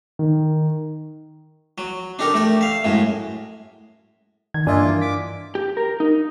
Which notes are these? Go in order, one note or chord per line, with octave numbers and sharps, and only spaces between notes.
D#3
F#3
D4 D#4 G4 A4 A#4
A3 G4 D5
E5 F5
F#2 A2 G#3
D#3 G#6
G2 A#3 D4 F4 D#5 E5 G#5
E3
D6 B6
G4
A#4
D#4